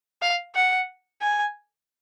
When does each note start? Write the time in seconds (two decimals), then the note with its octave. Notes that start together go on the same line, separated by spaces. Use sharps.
0.22 F5
0.55 F#5
1.21 G#5